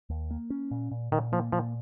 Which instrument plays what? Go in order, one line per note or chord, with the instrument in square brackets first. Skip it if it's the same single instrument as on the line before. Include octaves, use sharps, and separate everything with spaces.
[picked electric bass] D#2
A#3
C#4
A#2
A#2
[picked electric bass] A#2 [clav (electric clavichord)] D#3
[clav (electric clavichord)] F3 [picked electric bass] A#3
[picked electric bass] A#2 [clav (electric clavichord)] F3